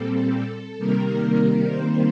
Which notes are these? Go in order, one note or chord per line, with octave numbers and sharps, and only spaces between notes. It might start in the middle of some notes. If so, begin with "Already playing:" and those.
Already playing: A#2 G3 C4 A4
C3 D#3 G3 A#3 A#4
C5